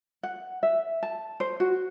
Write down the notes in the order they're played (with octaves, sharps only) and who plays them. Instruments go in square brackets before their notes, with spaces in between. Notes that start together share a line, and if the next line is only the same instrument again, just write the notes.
[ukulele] F#5
E5
A5
C5
F#4